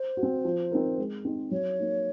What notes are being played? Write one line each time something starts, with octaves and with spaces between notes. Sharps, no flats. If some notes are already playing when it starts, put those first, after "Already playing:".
Already playing: C5
F#4
C4
F3
C4 D#4 A#4
G#3
C4 D#4
F#3 C#5
A#3 D#4